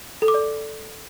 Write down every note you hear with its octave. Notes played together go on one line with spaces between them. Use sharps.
A4
D6
D5